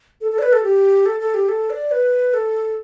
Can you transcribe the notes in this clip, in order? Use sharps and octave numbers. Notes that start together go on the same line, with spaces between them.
A4
A4
D5
B4
A4
G4
A4
A4
G4
A4
D5
B4
A4